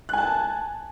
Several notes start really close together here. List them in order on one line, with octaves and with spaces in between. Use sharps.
F#6 G#5 A5